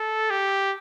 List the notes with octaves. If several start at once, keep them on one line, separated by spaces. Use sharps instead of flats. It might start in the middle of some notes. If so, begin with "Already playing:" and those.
Already playing: A4
G4